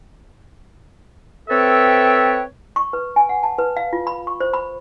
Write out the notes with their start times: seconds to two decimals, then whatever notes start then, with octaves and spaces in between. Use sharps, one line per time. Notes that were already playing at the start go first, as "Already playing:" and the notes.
1.49 C4 A4 B4 C#5 E5 G5
2.76 C#6
2.93 B4
3.16 G#5
3.29 F#5
3.43 A5
3.59 B4
3.77 F5
3.93 F4
4.07 B5
4.27 C#6
4.41 C5
4.54 B5